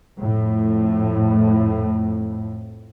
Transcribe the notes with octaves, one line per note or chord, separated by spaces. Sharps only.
F2 A2